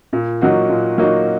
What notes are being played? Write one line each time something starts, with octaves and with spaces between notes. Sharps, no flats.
A#2
F#3 A#3 D#4 F#4
A#2
F#3 A#3 D#4 F#4